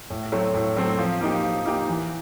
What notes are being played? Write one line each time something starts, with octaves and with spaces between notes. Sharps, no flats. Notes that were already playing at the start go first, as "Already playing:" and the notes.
A2
F#3 A3 C4
A2
F#3 A3 C4
F3
A#3 D#4 G4
F3
A#3 D#4 G4
E3